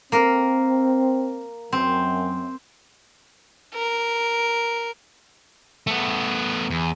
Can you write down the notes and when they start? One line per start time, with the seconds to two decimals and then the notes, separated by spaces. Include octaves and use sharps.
0.12 A#3 C4 A#4
1.73 F#2 C4
3.74 A#4
5.87 A3 B3
6.70 E2